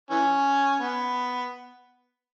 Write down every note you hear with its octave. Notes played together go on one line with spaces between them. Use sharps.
E3 C#4
B3